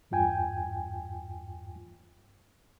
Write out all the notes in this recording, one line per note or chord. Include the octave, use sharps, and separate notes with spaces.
E2 G2 F4 G5 G#5